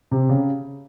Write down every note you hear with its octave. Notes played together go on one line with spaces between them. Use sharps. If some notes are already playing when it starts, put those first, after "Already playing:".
C3
C#3